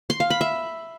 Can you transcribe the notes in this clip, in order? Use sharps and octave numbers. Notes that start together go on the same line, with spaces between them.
C6
F5
B5
E5